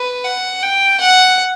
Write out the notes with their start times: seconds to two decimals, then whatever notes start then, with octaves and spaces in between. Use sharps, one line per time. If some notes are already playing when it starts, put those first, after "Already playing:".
Already playing: B4
0.24 F#5
0.62 G5
1.00 F#5